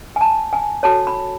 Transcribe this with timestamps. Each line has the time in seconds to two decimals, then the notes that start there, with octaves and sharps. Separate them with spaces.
0.16 G#5
0.21 A5
0.53 G#5
0.83 F#4 A4 C#5 A5
1.07 B5